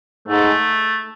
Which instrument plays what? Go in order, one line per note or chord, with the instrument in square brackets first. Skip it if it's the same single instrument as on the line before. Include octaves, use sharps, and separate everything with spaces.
[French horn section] G#2 [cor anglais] A3